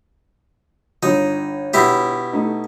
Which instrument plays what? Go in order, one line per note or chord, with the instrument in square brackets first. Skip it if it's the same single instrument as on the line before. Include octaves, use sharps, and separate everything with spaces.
[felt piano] G1 [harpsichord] D#4
[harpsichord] B2 E4 G4
[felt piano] A3 D#4